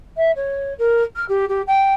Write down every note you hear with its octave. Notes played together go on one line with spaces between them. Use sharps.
E5
C#5
A#4
F6
G4
G4
G5